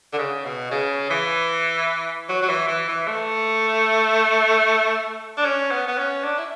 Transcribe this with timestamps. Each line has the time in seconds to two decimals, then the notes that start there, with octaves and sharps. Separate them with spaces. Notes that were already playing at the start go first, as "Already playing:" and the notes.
0.13 D3
0.18 C#3
0.45 B2
0.71 C#3
1.10 E3
2.29 F#3
2.42 F#3
2.49 E3
2.68 E3
2.88 E3
3.08 A3
5.38 D4
5.45 C#4
5.71 B3
5.88 B3
5.98 C#4
6.24 D4
6.38 E4